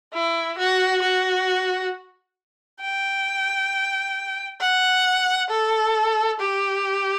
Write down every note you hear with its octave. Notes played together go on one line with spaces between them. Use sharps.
E4
F#4
F#4
G5
F#5
A4
G4